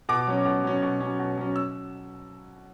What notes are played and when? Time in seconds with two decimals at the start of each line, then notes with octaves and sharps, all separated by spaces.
0.09 B2 D6
0.27 F#3 C#4
0.45 B2
0.63 F#3 C#4
0.82 B2
1.00 F#3 C#4
1.19 B2
1.37 F#3 C#4
1.56 E6